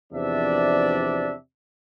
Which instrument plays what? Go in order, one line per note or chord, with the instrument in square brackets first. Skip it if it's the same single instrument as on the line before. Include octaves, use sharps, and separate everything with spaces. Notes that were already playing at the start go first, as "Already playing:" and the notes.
[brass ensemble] E2 C3 F3 D4 D5 E5